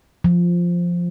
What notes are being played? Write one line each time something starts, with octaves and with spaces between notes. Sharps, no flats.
F3